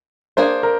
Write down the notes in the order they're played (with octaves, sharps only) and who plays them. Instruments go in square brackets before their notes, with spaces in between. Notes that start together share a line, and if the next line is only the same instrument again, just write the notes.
[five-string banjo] A#3 D4 G#4 [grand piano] C5
[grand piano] A#4